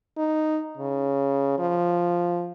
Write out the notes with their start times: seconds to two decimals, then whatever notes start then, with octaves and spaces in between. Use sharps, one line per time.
0.18 D#4
0.77 C#3
1.58 F3